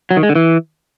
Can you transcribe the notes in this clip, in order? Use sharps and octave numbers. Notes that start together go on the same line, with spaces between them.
F#3
D#3
G#3
D3
E3